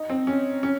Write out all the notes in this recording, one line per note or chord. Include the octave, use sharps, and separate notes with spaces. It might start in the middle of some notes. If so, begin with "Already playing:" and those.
Already playing: D#4
C4
C#4
C#4